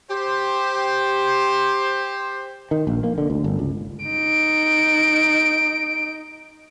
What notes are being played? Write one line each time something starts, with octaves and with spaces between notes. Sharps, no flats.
G4 C5
D#3
A#1
A#3
D3
D2
G1
C#2
D#4 D7